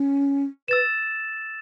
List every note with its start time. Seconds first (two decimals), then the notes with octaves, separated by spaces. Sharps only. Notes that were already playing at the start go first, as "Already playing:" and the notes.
Already playing: C#4
0.68 B4 E6 A6 E7